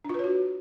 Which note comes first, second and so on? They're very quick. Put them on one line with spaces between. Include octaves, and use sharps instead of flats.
D4 F4 B4 C#5 F#4